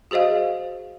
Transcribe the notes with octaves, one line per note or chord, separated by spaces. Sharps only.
F#4 G#4 C5 D#5 F5